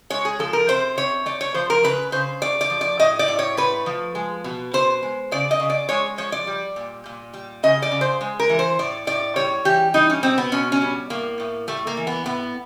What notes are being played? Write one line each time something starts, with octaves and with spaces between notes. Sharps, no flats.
G#3 C#5
G#4
F3 A4
A#4
C3 C5
C3 C#5
A3 D5
C#5
F3 C5
A#4
C#3 B4
C#3 C5
A3 D5
D5
F3
D5
A2 D#5
D5
A2
C#5
A3 B4
F3
G#3
B2
B2 C5
G#3
C#3 D5
D#5
C#3
D5
G#3 C#5
F3 C#5
D5
G3
A#2
A#2
G3
C#3 D#5
D5
C#3
C5
G#3
A#4
E3
C5
A2 D5
A2 D5
G3 C#5
E3 G4
G3 D#4
C#4
B2 C4
B3
B2 C#4
C#4
G3
A2 A#3
A2
G3 A3
A#3
E3
B3
A2 B3